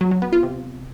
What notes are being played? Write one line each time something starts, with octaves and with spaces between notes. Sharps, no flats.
F#3
F#3
B3
F4
C3